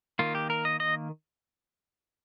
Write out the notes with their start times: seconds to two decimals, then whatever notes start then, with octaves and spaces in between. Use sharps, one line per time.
0.19 D#3 A#3 F4
0.35 G4
0.50 A#4
0.65 D#5
0.80 D#5